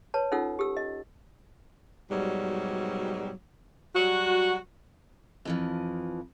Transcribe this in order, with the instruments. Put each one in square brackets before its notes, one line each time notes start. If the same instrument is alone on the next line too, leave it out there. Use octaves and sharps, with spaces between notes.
[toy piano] B4 C#5 A5
C#4 D#4 F4 A4 F#5 E6
G4 A4 E6
D#5
[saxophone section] G#2 B2 F#3 G3
F#3 G3 F#4
[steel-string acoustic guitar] F2 E3 F3